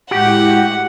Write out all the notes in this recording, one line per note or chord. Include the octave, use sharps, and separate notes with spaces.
A2 G#3 E4 F#4 G4 F#5